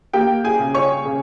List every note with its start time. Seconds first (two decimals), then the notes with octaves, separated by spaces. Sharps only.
0.13 A#3 G4 G5
0.44 G#4 G#5
0.59 C#3
0.74 C#5 C#6
1.05 C#3